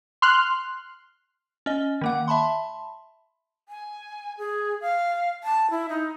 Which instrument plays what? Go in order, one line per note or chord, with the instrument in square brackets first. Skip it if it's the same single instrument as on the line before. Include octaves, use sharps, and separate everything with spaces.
[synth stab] C6 F6 F#6
[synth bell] C#4 D#5
D#3 A#3 F#5
E5 A5 B5 C6
[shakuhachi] G#5
G#4
F5
A5
E4
D#4